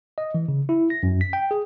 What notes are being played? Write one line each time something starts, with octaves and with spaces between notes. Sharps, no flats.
D#5
E3
C#3
E4
A#6
F#2
B6
G5
G#4